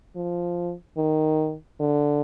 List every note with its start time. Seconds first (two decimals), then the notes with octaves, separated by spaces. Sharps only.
0.16 F3
0.97 D#3
1.80 D3